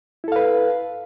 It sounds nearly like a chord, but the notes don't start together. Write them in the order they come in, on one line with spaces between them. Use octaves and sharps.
E4 A4 F5 B4